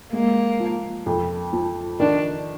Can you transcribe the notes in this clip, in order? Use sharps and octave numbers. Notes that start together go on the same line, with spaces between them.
G#3 A#3
F3
F2
F3
D#3 D4